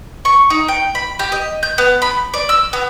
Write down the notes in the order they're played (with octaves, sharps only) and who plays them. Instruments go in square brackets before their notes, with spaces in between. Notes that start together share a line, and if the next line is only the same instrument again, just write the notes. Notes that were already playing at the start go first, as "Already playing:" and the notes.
[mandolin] C#6
D#4
G5
B5
G4
D#5
G6
B3
B5
D5
E6
B3